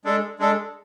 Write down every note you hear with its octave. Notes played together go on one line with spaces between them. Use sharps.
G#3 D4 A4
G#3 D4 A4